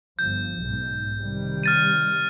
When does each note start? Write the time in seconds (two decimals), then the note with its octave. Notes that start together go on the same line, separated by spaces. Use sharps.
0.19 G1 F3 G6
0.58 B1 G#2
1.20 C3 D#3 G3
1.64 F6 A6 D#7